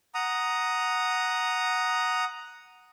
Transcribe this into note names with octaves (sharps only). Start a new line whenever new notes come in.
F#5 A#5 D#6